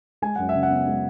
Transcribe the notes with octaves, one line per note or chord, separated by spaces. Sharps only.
G#3 G#5
F#2 F#5
E5
C#3
F#5
B3
G#3